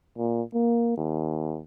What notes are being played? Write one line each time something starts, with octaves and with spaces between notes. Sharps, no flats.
A#2
A#3
D#2